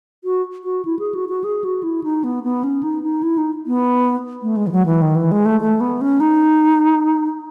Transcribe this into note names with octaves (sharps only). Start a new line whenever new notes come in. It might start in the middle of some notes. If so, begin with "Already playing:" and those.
F#4
F#4
E4
G#4
F#4
F#4
G#4
F#4
E4
D#4
B3
B3
C#4
D#4
D#4
E4
D#4
B3
A3
G#3
E3
F#3
E3
D#3
E3
G#3
A3
A3
B3
C#4
D#4